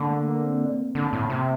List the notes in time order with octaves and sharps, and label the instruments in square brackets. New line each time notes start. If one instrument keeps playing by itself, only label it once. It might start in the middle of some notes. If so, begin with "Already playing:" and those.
Already playing: [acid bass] D3 [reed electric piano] A#3
[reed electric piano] A3
A#3
C4
[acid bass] D3
A2
C3